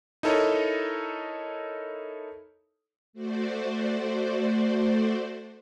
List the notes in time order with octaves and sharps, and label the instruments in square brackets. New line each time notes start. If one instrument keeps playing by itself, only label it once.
[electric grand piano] D#4 E4 A4 A#4 C#5 D#5
[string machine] A3 F#4 C5 D5